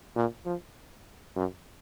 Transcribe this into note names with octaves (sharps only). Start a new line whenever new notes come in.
A#2
F3
F#2